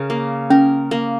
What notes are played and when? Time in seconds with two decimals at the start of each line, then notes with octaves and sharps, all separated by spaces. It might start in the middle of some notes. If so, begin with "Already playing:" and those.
Already playing: C#3 A#4
0.10 A#3
0.50 C#4 A#4
0.91 A#3